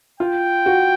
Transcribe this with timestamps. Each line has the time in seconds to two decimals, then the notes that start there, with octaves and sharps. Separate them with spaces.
0.20 F4 G5
0.66 F#4